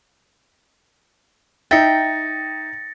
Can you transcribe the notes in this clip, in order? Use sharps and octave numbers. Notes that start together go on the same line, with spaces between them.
D#4 E5 G5 A6 A#6 C#7